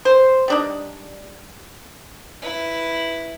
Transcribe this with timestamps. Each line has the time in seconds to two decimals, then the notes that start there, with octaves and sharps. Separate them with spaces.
0.05 C5
0.48 G3 D4 D#4
2.42 E4 B4